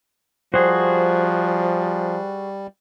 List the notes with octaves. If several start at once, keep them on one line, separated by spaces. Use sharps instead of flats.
F3 G3 F#4 G#4 C5